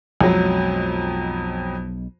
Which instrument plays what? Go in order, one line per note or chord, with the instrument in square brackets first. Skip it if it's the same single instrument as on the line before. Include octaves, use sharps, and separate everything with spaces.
[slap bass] B1 G#3 [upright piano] F2 F#3